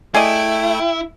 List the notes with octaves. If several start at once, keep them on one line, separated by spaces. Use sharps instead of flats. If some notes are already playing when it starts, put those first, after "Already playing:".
A3 E4 G#4 D5 D#5 G5